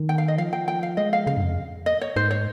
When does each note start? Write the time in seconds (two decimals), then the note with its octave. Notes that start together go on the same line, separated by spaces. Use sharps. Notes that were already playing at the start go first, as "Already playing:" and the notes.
Already playing: D#3
0.09 G5
0.18 F5
0.28 D#5
0.38 F3 F5
0.53 G5
0.68 G5
0.83 F5
0.97 G#3 D#5
1.13 F5
1.27 C#3 F5
1.37 G2
1.43 F2
1.86 D#5
2.01 C#5
2.16 G#2 C5
2.31 C#5